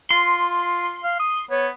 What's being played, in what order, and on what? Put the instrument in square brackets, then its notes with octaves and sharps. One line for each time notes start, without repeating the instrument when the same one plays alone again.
[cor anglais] F4 [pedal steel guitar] C6
[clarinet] F5
D#6
[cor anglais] B3 [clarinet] C#5